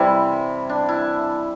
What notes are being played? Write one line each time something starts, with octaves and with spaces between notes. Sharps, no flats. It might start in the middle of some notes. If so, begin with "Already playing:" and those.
Already playing: C3 E3 G3 E4
D4
E4